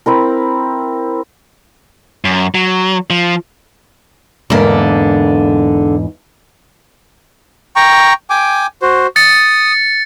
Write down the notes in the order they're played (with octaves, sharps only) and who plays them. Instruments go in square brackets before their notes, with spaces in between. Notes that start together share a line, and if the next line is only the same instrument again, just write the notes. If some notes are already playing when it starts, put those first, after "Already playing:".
[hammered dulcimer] C4 E4 A#4
[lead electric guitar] F#2
F#3
F3
[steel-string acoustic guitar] E2 G#2 B4 [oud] D3 A#3
[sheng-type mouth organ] G5 A#5 C#6
G5 G#5 D6
F#4 C5
[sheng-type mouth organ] D#6 [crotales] A6 C#7